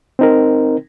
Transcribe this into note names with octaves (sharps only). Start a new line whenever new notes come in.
C4 D#4 A#4